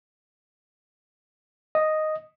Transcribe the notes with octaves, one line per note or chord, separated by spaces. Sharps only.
D#5